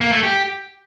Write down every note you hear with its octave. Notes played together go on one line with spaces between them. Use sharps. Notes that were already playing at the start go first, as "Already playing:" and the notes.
A#3
A3
G4